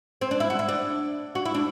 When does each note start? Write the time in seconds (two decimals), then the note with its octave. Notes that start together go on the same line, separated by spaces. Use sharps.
0.21 C4
0.31 D4
0.40 E4
0.50 F#4
0.59 E4
0.69 D4
1.35 F#4
1.45 E4
1.55 D4